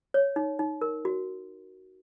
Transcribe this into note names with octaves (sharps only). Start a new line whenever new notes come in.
C#5
D#4
D#4
A#4
F#4